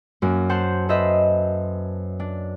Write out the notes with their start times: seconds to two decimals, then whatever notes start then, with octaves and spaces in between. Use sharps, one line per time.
0.22 F#2 A#3 F#4
0.49 C5 F#5 A5
0.89 A4 B4 C5 D#5 E5
2.20 D4